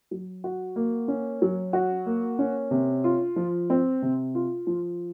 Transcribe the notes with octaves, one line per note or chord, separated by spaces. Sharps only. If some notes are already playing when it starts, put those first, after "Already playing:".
F#3
F#4
A#3
C#4
F#3
F#4
A#3
C#4
C3
F4
F3
C4
C3
F4
F3